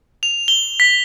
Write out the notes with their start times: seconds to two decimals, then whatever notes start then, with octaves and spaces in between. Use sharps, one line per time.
0.23 F7
0.48 G7
0.80 B6